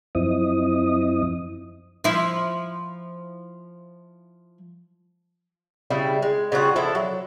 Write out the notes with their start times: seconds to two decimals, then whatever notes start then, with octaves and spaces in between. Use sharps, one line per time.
0.15 F#2 F3 C4 E4 D#5 D#6
2.04 F3 E4
5.90 C#3 G3 E4
6.22 G#3
6.52 C#3 G3 F4 F#4
6.76 F3 D4 E4 A4
6.95 F#3